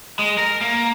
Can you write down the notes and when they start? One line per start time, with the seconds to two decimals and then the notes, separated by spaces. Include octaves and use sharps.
0.19 G#3
0.38 A#4
0.61 A#3